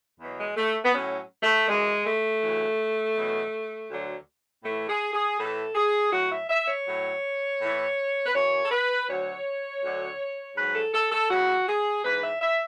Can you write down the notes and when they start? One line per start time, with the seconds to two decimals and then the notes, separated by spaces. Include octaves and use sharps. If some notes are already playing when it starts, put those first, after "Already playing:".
0.20 E2 B2 F#3
0.39 G#3
0.57 A3
0.84 B3
0.94 A2 F#3 C#4
1.43 A3
1.68 F#2 E3 G#3
2.05 A3
2.42 D2 C#3 E3
3.17 E2 B2 F#3
3.91 D2 D3 F#3
4.64 A2 E3 A3
4.89 G#4
5.14 G#4
5.39 A2 E3 A4
5.75 G#4
6.12 A2 F#3 F#4
6.31 E5
6.49 E5
6.67 C#5
6.86 A2 F#3
7.60 A2 E3
8.25 B4
8.34 F#2 E3 C#5
8.66 A4
8.71 B4
9.08 D2 D3 F#3 C#5
9.82 D2 D3 F#3
10.56 G#2 F#3 B4
10.75 A4
10.93 A4
11.11 A4
11.30 E2 C#3 F#3 F#4
11.68 G#4
12.04 G#2 E3 B4
12.22 E5
12.41 E5